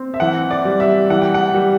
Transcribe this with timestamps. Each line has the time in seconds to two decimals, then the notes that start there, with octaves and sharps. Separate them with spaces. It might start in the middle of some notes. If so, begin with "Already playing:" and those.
Already playing: C4
0.14 E5
0.20 E3 F#5
0.51 D5
0.65 G3
0.80 E5
1.10 E3 F#5
1.21 G5
1.34 F#5
1.54 G3